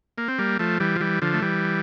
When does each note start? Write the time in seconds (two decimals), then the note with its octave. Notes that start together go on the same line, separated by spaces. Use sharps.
0.18 A#3
0.28 C4
0.39 G3 A#3
0.59 F3 A3
0.80 E3 G3
0.96 F3
1.00 E3 G3
1.22 D3 F3
1.34 A3
1.42 E3 G3